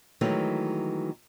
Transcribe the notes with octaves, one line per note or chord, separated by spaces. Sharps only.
D#3 E3 F#3 G#3 A3